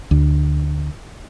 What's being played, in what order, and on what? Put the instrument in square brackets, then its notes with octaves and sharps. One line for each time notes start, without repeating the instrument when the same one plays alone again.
[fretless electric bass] D2